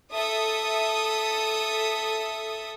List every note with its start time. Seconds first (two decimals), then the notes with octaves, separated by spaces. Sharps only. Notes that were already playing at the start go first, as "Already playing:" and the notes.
0.11 A4 E5 D#6